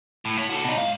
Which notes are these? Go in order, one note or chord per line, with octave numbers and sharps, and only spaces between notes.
A2
E4 C#5
F#4 A4
B2 D#4
G#2 F5